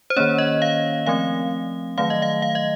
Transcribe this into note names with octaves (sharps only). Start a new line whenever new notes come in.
C5
D#3 A#3 C#4 C#5
D#5
F5
F3 A3 C4 F5
D#3 F#3 A3 F5
D#5
F5
F5
D#5